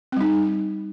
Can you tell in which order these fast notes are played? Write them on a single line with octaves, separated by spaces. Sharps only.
C4 G3 D#4